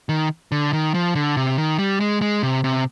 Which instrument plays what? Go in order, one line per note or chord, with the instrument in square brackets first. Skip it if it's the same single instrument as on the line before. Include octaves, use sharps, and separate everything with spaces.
[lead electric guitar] D#3
D3
D#3
F3
D3
C3
D#3
G3
G#3
G#3
C3
C3